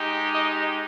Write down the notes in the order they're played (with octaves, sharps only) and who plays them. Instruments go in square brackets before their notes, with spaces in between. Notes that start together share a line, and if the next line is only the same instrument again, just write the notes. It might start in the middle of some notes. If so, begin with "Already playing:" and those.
Already playing: [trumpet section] G#3 D#4 G4
D#5